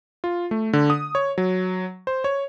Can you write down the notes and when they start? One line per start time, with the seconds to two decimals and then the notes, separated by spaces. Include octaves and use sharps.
0.24 F4
0.51 A3
0.73 D3
0.90 D#6
1.15 C#5
1.38 F#3
2.07 C5
2.24 C#5